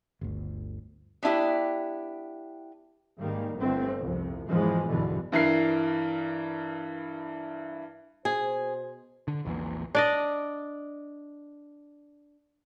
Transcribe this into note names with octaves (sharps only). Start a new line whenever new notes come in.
G1 D2
B3 D4 E4 G4
G#2 D#3 G3 A#3
G1 G2 D3 A3 C4
C2 F2 C3
G#1 E2 E3 F3 G#3
B1 E2 G2 B2 D3 E3
G2 E3 A#4 C7
B2 G#4 C5
D3
A#1 E2 A#2
D4 D5 D#5